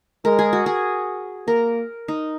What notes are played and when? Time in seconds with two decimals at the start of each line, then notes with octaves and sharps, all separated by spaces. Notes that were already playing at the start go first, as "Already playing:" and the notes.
0.25 G#3 A#4
0.39 G#4
0.53 F#4
0.66 G#4
1.47 A#3 A#4
2.08 D#4